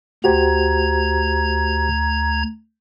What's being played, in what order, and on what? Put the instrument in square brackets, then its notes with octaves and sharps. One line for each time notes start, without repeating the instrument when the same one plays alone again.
[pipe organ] D2 A#5 G#6 [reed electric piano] F#4 G4 C5